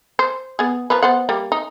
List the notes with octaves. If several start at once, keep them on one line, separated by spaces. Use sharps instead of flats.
C5
B3 G#4
F3 A#4 B4
B3 C5 F#5
G3 A#3
D#4